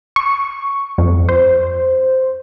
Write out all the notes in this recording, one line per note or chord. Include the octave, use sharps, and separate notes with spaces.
C#6
F2
C5